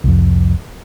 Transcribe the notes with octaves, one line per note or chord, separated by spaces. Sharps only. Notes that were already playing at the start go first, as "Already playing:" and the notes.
C2 F2